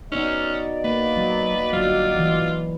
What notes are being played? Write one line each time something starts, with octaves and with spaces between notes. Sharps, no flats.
B3 C#4 D#4 F#4 D5 D#5
A#3 B4
F#3
G1 F#3 F4
E3